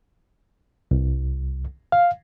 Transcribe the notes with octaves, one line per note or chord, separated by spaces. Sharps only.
C2
F5